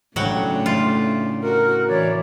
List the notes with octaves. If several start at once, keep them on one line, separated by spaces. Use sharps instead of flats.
A2 C#3 F#3 A3 D4 F#5 G5
F4
F#4 A#4
E3 C#5 D5